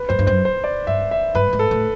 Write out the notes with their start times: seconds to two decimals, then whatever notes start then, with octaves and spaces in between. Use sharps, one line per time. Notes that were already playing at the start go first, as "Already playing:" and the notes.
Already playing: B4
0.09 G2 C5
0.19 G2
0.27 F#2 C5
0.45 C5
0.64 D5
0.87 G2 E5
1.11 E5
1.35 G2 B4
1.53 G#2
1.59 A4
1.71 A2